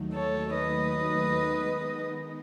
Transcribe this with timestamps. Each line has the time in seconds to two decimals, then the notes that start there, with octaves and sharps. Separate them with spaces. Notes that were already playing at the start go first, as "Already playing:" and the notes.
Already playing: D#2 D#3 F#3 A3 D#4
0.13 A4 C#5
0.55 B4 D#5
1.39 D#3 G#3 B3 D#4